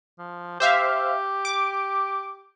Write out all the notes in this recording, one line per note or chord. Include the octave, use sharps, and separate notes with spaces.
F3
G4 C5 E5 F5
D6